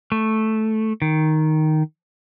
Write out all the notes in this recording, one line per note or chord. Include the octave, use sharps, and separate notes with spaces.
A3
D#3